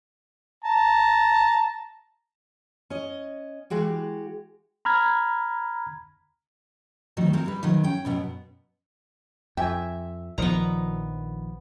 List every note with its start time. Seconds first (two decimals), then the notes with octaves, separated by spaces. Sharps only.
0.64 A5 A#5
2.90 C#4 D#5
3.70 E3 G#3 F#4 G4
4.85 A#5 B5 F6 G#6
7.17 D2 D#3 F#3 D#4
7.33 G#3 C4 A#4
7.46 G3 B4
7.63 B2 D#3 F#3
7.84 C#4 G5
8.05 F#2 B2 B3
9.57 F2 E5 G5 G#5
10.38 A#1 D#3 F3 B3 A#5